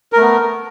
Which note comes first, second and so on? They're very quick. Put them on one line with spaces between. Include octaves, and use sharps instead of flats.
A#4 A3 B3